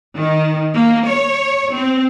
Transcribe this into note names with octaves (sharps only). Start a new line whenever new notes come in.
D#3
A#3
C#5
C4